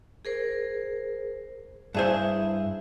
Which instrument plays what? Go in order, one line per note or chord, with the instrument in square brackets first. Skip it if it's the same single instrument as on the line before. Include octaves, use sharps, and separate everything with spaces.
[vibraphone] G#4 A#4 C5
[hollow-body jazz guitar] G2 G#4 C5 [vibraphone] E4 E5